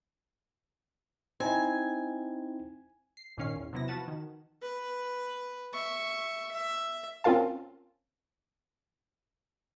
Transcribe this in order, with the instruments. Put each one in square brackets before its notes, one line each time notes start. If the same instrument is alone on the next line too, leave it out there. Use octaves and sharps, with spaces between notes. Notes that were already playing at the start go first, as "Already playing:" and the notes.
[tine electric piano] C4 D#4 E4 [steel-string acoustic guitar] G#5
[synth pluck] C7
G#1 A#2 D#3 C#4 F5 C7
E2
C3 F#3 B3 E4 A#6
F3 F#4 B4 F#5 A5 E7
D#3
[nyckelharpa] B4
E5 C#6
E5
[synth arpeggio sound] C4 C#4 F4 A#4 F5 A5